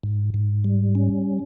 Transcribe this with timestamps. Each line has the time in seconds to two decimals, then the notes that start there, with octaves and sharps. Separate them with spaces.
0.03 G#2
0.34 G#2
0.64 G3
0.95 C#4